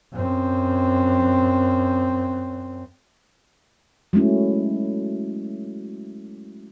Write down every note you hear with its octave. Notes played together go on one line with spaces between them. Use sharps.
F#2 C4
F#3 G#3 A3 C#4 E4